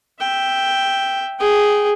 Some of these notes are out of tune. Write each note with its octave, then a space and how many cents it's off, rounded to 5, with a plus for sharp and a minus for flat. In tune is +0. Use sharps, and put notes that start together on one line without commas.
E5 +0 G5 +0
G#4 +0 G5 -15